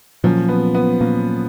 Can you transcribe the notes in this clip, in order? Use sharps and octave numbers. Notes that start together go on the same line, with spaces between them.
A#2 F3 F#3 A#3 C#4
B3
B3
A#2 F#3 A#3 C#4